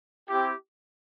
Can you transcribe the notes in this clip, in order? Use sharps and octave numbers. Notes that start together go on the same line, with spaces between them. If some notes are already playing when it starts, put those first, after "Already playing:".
C4 E4 G4